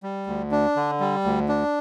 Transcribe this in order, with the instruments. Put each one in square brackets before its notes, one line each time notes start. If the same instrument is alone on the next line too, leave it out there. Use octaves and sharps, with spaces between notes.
[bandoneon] G3
D2
D4
D3
G3
D2
D4